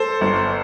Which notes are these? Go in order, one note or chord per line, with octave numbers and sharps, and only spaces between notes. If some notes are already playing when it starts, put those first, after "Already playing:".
Already playing: A4 C5
G1